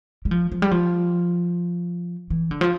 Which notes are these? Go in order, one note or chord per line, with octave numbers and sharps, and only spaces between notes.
G3
F3
F3
G3
F3
E3
D3
F3